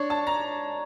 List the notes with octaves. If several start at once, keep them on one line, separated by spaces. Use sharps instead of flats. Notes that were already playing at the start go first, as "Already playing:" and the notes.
Already playing: D4 C#5
A5
A#5